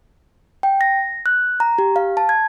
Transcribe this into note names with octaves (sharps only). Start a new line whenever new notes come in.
G5
A#6
F#6
A#5
G4
F5
A5
G#6